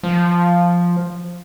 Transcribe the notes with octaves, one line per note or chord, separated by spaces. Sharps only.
F3